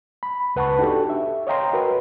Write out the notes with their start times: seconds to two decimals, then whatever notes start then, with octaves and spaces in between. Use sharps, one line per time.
0.23 B5
0.56 C#2 B4 F#5 A5 B5 C#6
0.79 D4 D#4 F#4 G4 A4
1.10 E5
1.47 C#5 D#5 F5 G5 A#5 C6
1.73 F#4 A#4 B4